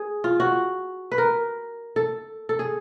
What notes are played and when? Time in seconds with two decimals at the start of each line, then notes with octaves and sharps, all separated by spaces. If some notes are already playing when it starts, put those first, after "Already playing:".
Already playing: G#4
0.24 F4
0.40 F#4
1.12 B4
1.18 A#4
1.96 A4
2.49 A4
2.59 G#4